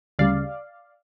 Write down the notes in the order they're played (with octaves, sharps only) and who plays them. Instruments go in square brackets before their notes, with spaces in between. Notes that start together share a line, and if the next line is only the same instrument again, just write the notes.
[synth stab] D2 C#3 G3 D5 F5